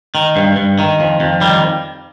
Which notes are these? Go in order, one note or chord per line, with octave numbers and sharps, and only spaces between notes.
D#3
G2
G2
D#3
F2
F2
D#3 G3